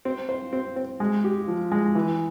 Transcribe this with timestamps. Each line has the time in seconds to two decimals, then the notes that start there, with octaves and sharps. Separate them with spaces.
0.05 C4
0.29 C5
0.53 C4
0.76 C4
1.00 G#3
1.24 G4
1.48 F3
1.72 G#3
1.95 E3